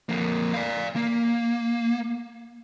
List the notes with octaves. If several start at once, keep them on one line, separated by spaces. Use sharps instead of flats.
F2 A#3
D5 F5
A#3